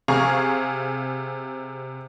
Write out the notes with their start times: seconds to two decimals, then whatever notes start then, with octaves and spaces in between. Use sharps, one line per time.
0.08 C3 G#4 F5 A#5 C#6